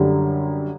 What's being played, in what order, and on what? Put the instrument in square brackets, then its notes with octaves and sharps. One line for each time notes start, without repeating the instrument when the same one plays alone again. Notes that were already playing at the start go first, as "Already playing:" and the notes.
Already playing: [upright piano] F#2 D3 G3